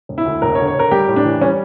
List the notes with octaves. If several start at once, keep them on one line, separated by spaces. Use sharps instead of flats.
E1
E4
D2
E1 A#4
C#5
D3
C#5
D3 A#4
G3 G4
A2
D4
E3
G3 C#4